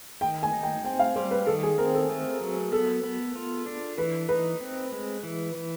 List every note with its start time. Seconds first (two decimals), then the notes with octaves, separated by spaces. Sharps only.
0.21 D#3 G5
0.43 G#5
0.53 D#4
0.63 G5
0.84 C4 G5
0.99 F5
1.16 G3 C5
1.31 B4
1.46 D#3 A4
1.63 G#4
1.78 C4 A#4
1.94 A4
2.09 A3
2.41 F#3
2.72 B3 A4
3.03 B3
3.35 F4
3.66 D4
3.98 E3 B4
4.29 D#4 B4
4.60 C4
4.92 G#3
5.23 E3
5.55 E3